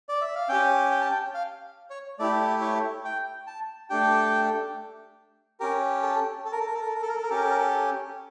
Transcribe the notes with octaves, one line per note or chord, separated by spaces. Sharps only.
D5
E5
F5
C#4 G4 G5
G5
A5
G5
F5
C#5
A3 E4 G4 D5
C#5
G5
A5
A3 D4 G4 G5
C#4 G4 A#4
A4
A4
A#4
A4
A#4
A4
A#4
A4
A#4
A4
A#4
A4
A#4
C#4 G4 A4
A#4
A4
A#4
A4